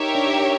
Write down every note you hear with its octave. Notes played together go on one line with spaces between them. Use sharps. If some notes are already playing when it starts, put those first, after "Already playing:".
Already playing: D#4 G4 A#4 C#5 E5
D4